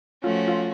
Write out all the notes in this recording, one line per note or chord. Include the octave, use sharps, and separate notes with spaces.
F3 A3 C#4 F4 F#4
F4